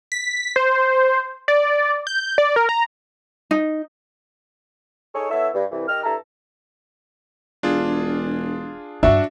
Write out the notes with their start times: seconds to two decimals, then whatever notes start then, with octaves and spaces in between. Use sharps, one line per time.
0.12 B6
0.56 C5
1.48 D5
2.07 G6
2.38 D5
2.56 A#4
2.69 A#5
3.51 D#4
5.14 D#4 G#4 A4 C#5
5.30 B3 E4 A4 C#5 E5
5.53 G2
5.71 C2 E3
5.88 D#3 G4 D#5 F6
6.04 G2 E4 A4 A5 A#5
7.63 E1 D4 F4 G#4
9.03 G2 D4 E4 F#4 E5